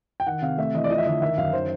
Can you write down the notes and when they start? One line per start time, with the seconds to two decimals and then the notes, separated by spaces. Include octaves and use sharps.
0.20 G5
0.27 D#3 F#5
0.42 C3 F5
0.58 A3 E5
0.74 E3 D#5
0.84 D5
0.90 F3 D#5
0.98 E5
1.05 D3 D#5
1.22 D#3 E5
1.38 F#2 F5
1.53 D#3 C5